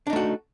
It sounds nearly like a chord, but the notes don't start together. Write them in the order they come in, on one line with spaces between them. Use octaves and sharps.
D4 D#4 A3 F#4